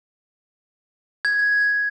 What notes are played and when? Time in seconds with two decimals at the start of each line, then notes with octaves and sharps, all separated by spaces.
1.25 G#6